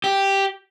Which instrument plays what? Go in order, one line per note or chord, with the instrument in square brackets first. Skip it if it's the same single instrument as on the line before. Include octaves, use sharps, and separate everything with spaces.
[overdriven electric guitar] G4